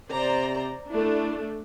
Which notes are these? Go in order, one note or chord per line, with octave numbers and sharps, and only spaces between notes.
C3 C5 D5 A#5
A3 D4 E4